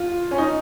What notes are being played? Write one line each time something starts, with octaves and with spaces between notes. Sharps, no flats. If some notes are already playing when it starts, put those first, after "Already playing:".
Already playing: F4
C#4
D#4